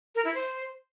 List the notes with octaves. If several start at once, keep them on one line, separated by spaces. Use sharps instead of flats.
A#4
E4
C5